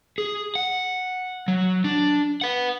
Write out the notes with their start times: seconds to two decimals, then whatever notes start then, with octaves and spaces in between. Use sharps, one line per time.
0.18 G#4
0.55 F#5
1.48 F#3
1.84 D4
2.42 B4 F#5